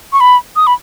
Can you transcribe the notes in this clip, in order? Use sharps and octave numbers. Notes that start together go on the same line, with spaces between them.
C#6
B5
D#6
B5